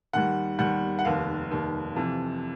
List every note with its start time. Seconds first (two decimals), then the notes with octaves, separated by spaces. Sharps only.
0.13 D#2 D#3 G3 F#5
0.59 D#2 D#3 G3 F#5
0.99 F#5
1.05 F1 D#2 D#3 F5
1.50 F1 D#2 D#3
1.96 F2 C3 E3